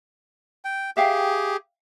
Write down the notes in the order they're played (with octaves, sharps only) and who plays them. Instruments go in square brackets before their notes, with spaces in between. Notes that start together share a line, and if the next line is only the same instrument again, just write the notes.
[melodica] G5
[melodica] G4 G#4 [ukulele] E5 F5 G5